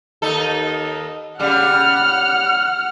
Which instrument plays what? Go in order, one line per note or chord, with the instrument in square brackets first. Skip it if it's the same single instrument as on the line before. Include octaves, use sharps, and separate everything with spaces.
[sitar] D#2 D#4 A4
[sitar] C#3 G3 [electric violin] F#5 F6